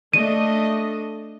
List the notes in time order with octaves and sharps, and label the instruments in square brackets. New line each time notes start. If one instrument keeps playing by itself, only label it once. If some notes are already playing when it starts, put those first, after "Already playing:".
[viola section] A3 D4 D#5 [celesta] D#7